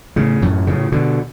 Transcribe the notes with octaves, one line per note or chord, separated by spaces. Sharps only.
A2 C#3
F#2 A2
A2 C#3
B2 D3